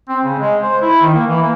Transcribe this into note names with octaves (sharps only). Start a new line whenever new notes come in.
C4
C#3
G#3
C5
E4
D#3
A#3
E3
A#3